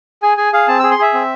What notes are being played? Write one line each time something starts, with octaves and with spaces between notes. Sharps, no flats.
G#4 G#5
G#4 G#5
G#4 F5
C4 A5
G#4 E6
C6
G#4 E5
C4